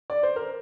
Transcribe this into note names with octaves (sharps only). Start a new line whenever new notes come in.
D5
C5
A#4